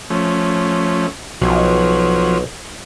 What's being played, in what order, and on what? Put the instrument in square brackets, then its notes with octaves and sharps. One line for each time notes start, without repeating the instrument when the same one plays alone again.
[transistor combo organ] F3 A3 C#4
[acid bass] B1 [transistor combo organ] F3 F#3